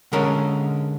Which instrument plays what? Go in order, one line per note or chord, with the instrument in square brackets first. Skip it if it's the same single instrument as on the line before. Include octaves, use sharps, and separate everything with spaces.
[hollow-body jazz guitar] D3 G#3 C#4 A#4